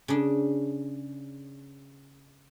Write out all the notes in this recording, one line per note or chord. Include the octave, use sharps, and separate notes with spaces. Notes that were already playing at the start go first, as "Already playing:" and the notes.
C#3 D4